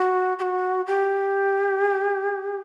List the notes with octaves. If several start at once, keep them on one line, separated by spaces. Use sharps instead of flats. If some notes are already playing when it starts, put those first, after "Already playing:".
Already playing: F#4
G4
F#4
G4